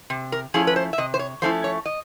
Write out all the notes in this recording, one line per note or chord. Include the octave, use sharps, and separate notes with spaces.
C3
A#4
F3 A3 C#4 E4 G#4
B4
C5
E5
C3 D#5
C5
C#5
F3 A3 C#4 E4 C5
C#5
D#5